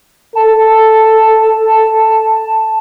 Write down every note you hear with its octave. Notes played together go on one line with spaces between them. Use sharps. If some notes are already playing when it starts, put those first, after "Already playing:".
A4 A5